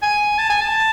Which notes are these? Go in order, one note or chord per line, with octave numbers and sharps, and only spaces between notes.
G#5
A5
G#5
A5